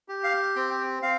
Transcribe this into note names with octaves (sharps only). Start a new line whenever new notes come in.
G4
F5
C4 G5
C4 F5